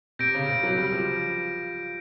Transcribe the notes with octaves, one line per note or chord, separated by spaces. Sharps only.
C3 G6 A#6 D7
C#3
C3
F#3
G3
F3